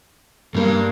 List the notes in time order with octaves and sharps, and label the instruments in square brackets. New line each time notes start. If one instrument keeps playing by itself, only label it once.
[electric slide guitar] G2 G3 [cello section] A#3